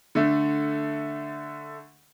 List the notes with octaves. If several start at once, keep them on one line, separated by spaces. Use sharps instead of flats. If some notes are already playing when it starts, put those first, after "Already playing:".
D3 A3